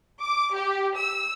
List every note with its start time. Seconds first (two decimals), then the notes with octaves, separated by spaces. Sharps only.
0.21 D6
0.54 G4
0.95 E6